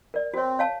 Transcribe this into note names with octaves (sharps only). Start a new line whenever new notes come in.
A#4 D5
C4 F#4 C#5
C#5 F5 A5